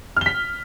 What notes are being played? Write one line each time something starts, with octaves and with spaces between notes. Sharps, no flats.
F6 B6 G7